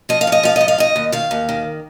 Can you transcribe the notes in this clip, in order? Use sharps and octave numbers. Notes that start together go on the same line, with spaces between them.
F3 D#5
F5
G#2
D#5
F3 F5
G#2 D#5
F5
D#3 D#5
D#2
D#3 F5
D#2
D#3